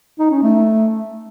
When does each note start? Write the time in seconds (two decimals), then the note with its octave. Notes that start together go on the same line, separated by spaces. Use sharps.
0.19 D#4
0.31 C#4
0.43 A3